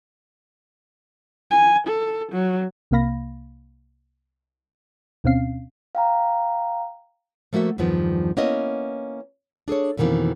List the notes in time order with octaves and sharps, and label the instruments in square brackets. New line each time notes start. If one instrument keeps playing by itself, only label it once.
[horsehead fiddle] G#5
A4
F#3
[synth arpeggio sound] C2 C3 A#3 F5 B5 A#6
D2 B2 C4 C#4 F5 C7
[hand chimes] F5 G5 A#5
[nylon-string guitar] F3 A3 A#3 F#4 E5
E2 G2 D#3 F3 B3
A#3 B3 C#4 E4 D#5
D4 G#4 A4 C#5
F2 B2 D#3 E3 A#3 C4